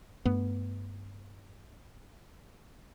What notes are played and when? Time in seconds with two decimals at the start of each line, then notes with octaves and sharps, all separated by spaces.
0.25 G2 A3 B3